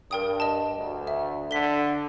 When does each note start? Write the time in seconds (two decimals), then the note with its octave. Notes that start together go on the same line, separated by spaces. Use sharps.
0.11 G2 A#4 G5 D#6
0.40 D#5 A5
0.78 D2
1.07 E5
1.51 D3 B6 G7